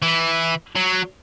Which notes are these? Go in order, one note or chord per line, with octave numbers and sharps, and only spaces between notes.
E3
F#3